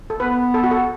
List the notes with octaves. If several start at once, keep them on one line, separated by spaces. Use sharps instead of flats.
A4
B3 B4
A4
F#4
A4